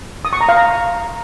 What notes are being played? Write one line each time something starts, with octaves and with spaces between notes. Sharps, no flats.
D#6
C#6
A#5
F5
A#5